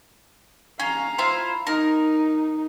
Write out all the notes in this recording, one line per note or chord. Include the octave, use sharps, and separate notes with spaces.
C#4 F5 A#5
E4 F4 C5
D#4 A#4